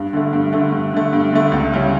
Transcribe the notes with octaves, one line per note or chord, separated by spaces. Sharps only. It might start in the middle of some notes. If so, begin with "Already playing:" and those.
Already playing: G2
D3 A3
G2
D3 A3
G2
D3 A3
G2
D3 A3
C#2
C#3 G3 C#4 E4